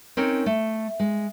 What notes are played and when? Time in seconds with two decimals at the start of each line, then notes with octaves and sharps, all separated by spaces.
0.17 C4 C#4 D#4 A#4 C#5
0.46 A3
1.00 G#3